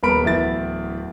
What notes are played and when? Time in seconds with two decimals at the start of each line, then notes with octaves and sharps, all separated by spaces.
0.03 D#1 B3 A#4 B5 D7
0.23 D1 E2 E4 A6